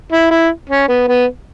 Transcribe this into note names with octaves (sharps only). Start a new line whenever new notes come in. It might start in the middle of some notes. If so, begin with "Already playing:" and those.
E4
E4
C#4
B3
B3